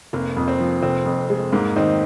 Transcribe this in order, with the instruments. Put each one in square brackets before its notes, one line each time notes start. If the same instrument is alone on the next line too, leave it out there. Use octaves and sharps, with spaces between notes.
[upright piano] F1 [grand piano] A#3
[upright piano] F2
[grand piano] C4
[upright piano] F3
[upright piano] F1 [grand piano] C4
[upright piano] F2
G#3
[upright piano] G#2 [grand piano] A#3
[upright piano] D#3 [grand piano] C4 D#4